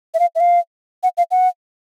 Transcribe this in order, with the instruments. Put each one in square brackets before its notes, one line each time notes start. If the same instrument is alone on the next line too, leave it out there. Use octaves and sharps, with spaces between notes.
[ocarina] E5
F5
E5
F5
F#5
F5
F#5